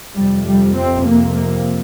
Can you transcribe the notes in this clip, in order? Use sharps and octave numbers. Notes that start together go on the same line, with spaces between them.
F2 C3 G3
G3
C4
A#3
A#3